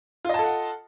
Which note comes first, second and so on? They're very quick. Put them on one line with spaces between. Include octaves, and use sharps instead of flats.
F4 D#5 A5 A4 F#5